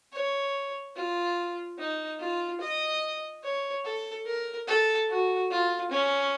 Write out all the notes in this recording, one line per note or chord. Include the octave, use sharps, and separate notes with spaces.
C#5
F4
D#4
F4
D#5
C#5
A4
A#4
A4
F#4
F4
C#4